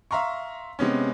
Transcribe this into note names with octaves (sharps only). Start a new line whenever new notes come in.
E5 F5 A#5 C6 C#6
C3 G#3 B3 C#4